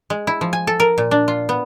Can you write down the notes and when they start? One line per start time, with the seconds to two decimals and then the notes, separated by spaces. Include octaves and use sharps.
0.10 G#3
0.27 E4
0.41 F3
0.53 G#5
0.67 A4
0.80 A#4
0.98 A#2
1.11 D4
1.28 F4
1.49 B3